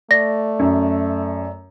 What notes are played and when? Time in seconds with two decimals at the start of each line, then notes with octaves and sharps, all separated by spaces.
0.11 A3 D5 A#6
0.59 F#2